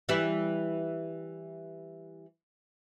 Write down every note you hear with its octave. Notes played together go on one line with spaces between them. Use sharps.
E3 G3 E4